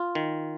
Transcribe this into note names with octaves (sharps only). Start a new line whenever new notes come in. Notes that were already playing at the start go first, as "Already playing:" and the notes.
Already playing: F4
D#3